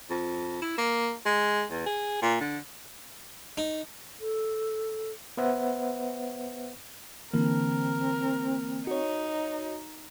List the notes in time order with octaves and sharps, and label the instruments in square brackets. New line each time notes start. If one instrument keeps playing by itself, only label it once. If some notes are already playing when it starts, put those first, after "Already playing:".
[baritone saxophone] F2
E4
A#3
G#3
E2
G#4
A#2
D3
[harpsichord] D#4
[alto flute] A4
[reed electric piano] B3 B4 C5 E5 F#5
[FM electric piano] D3 E3 A#3 [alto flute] C4 [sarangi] A#4
[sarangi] D#4 [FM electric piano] F#4 C#5